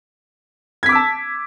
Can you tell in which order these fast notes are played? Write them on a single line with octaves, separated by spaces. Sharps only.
G#6 B6 D6 E6 A5